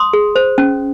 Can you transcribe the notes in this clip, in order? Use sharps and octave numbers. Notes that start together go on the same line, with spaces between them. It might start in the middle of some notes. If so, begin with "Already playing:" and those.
Already playing: C6 D#6
G#4
C5
C#4